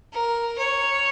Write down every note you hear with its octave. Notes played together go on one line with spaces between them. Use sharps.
A#4
C#5